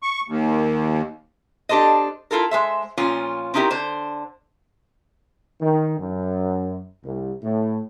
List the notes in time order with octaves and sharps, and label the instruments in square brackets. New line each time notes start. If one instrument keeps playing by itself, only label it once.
[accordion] C#6
D#2
[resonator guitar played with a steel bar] D4 G4 A4 C5 D#5
E4 F4 A4 A#4
G#3 C5 E5
A#2 F3 C#4 F4
C4 C#4 D#4 E4 G4 A#4
D3 C5
[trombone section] D#3
F#2
C2
A2